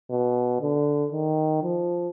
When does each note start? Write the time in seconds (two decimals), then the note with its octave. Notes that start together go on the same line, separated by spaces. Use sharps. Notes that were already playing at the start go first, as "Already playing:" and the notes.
0.11 B2
0.61 D3
1.12 D#3
1.63 F3